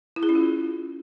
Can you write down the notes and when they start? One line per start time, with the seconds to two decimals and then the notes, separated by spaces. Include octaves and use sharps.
0.16 E4
0.23 G#4
0.29 C#4
0.35 F4